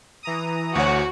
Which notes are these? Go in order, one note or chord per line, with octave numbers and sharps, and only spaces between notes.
E3 A#5 D#6
D2 F#4 C#5